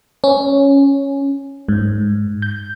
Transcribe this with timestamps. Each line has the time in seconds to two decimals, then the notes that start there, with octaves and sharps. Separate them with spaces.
0.24 C#4
1.69 G#2
2.42 G6